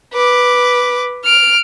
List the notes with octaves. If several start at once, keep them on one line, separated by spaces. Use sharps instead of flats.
B4 D6
F6 D7